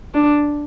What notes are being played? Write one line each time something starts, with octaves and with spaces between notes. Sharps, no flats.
D4